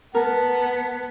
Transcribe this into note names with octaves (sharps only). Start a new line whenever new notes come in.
B3 A#4 F#5 A5